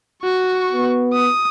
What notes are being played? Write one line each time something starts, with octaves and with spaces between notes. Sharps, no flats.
F#4 C#6
B3
D#6